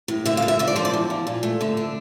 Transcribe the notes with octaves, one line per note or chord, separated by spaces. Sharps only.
A2
D3 E5
F5
F3
E5
D3 E5
D5
F3 C5
D5
E2
F3
A#2
A3
D3 E5
D4